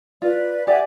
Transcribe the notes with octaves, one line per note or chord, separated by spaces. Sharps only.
F4 B4 D5
G4 D5 E5 F#5 G#5